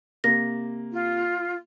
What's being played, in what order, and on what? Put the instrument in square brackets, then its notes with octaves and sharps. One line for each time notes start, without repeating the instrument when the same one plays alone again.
[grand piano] C3 A#3 [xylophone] A#6
[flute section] F4